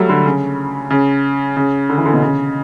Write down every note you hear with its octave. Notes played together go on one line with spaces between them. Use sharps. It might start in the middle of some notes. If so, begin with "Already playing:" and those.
Already playing: F#3 G3 A3
D3
C#3
C#3
C#3
D3
E3
D3
B2
C#3